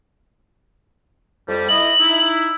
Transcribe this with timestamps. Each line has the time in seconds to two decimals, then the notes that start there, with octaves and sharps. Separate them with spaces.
1.48 F2 G3
1.69 E4 D#5 F#7
1.99 D#4 E4